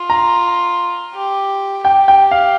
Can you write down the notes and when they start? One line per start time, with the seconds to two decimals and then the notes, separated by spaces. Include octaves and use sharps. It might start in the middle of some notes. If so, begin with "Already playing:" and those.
Already playing: F4
0.10 A#5
1.14 G4
1.84 G4 G5
2.08 G5
2.31 F5